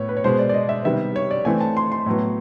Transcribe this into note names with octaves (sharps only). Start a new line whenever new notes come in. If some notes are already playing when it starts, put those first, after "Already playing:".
Already playing: A2 B3 C#5
B4
C#5
B2 G#3 B3 C5
D5
D5
D#5
E5
C3 D#3 G3 B3 E5
C#5
D5
E3 A3 C4 G#5
A5
C6
C6
A2 F#3 B3